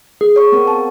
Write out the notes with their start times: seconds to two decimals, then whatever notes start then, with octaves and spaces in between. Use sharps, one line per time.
0.21 G#4
0.36 C#5 C#6
0.52 B3 C4 A#4
0.67 A5